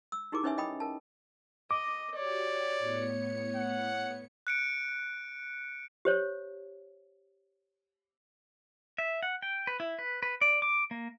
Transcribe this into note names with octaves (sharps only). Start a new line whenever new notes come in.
E6
D#4 E4 G4 G#4 A#4 D6
C#4 D#4 B4 C#5 E5 G#5
D#5 G5 B5 D#6
A#4 A5
D#5 D6
F#4 G4 C#5 D5
A2 B3 C#7
F#5
F#6 C#7 D7
G4 C5 C#5
E5
F#5
G5
B4
E4
B4
B4
D5
D6
A#3